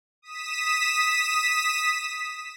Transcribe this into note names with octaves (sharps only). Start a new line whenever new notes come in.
D#6 B6 E7